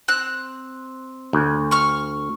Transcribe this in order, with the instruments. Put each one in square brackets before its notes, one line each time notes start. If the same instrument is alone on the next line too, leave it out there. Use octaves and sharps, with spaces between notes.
[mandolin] C4 F#6
[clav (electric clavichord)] D2
[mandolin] C#6 F6